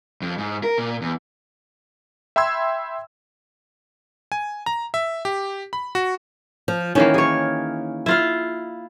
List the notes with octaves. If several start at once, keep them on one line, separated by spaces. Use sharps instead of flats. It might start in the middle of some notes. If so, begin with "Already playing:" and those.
F2
G#2
A#4
A#2
E2
E5 G5 B5 C6 E6 G#6
G#5
A#5
E5
G4
B5
F#4
F3
D#3 E3 A#3 C#4
G#4 C#5
E4 F4 F5